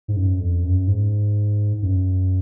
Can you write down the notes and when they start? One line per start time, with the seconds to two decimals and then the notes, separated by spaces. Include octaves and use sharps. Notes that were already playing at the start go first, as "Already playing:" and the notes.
0.08 G#2
0.16 F#2
0.40 F2
0.64 F#2
0.88 G#2
1.82 F#2